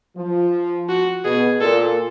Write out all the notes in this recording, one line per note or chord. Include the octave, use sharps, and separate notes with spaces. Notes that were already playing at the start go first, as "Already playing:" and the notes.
F3
F#4
B2 G#4
A#2 A4